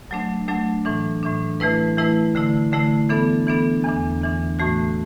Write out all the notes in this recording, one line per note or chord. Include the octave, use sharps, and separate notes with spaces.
F#3 A3 D4
F#3 A3 D4
A2 E3 D4
A2 E3 D4
E3 A3 E4 B4
E3 A3 E4 B4
D3 A3 E4
D3 A3 E4
E3 B3 D4 A4
E3 B3 D4 A4
E2 E3 D4
E2 E3 D4
A2 E3 A3 F#4